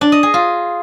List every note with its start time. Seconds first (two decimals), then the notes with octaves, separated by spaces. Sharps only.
0.01 D4
0.12 D#5
0.23 G#4
0.34 F4